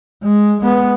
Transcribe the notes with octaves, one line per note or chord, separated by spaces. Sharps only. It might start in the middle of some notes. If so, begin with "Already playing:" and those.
G#3
G#3 B3